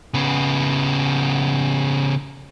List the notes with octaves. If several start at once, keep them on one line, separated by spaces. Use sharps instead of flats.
C#3 B3